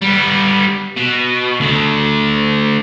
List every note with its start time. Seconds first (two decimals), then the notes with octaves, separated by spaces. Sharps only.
0.02 G3 B3
0.97 B2
1.60 D2 D3